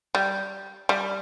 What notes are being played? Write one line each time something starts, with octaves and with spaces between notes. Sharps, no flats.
G3
G3